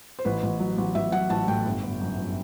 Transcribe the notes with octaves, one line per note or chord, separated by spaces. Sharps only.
C5
A1 B4
A1
F#3
A1
A1 E5
F#3 F#5
A1 A5
A2 G5
G1
G1
F#2
G1